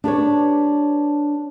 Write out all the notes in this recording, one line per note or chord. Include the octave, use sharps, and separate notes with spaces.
D4 G4 B4 C#5